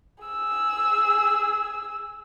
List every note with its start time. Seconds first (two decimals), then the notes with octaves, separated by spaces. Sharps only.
0.24 G#4 E6